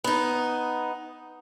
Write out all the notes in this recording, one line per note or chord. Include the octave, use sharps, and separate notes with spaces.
B3 D#4